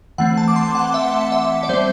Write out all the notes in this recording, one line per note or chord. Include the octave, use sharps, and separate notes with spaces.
E3 A3 C4 F#5
A5
D6
C6
F#5
E5
E5
D5
G3 C4 C5